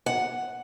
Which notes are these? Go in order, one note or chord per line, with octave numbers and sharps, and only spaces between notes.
F#5